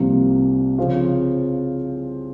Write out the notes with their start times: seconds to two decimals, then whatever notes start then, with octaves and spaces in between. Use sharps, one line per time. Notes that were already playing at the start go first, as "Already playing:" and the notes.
Already playing: C2 C3 F3 A#3 F4
0.78 C#3 F3 C4 F4